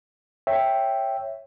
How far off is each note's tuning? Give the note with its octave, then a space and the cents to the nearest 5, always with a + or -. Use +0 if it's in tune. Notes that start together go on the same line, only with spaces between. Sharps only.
C#5 -15 E5 +0 G5 +0